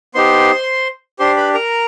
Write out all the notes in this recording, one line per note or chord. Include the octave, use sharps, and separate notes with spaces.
B3 D#4 G4 C5 C6
D4 G4 C5 C6
B4 B5
A#4 A#5